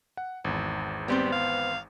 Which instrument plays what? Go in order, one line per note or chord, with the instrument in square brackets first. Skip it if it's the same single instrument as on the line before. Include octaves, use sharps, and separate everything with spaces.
[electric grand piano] F#5
G#1 E2
[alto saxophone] G3 [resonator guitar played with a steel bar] B3 C4 C5
[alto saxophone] F5